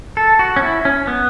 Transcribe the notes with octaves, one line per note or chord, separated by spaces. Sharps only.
A4
F#4
C#4
E4
C#4
B3